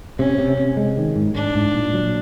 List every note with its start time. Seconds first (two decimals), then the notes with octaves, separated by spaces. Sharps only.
0.19 C3 C#4
0.38 C3
0.58 C3
0.77 G#3
0.97 D#3
1.16 G#2
1.35 G#2 D4
1.55 G#2
1.74 A#2
1.94 F#3